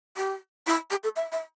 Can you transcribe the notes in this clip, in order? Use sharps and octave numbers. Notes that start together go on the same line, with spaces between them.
G4
E4
G4
A4
E5
E5